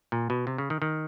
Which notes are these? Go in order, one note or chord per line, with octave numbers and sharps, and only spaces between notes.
A#2
B2
C3
C#3
D#3
D#3